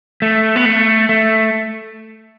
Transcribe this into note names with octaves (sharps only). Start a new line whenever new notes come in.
A3
B3
A3
A3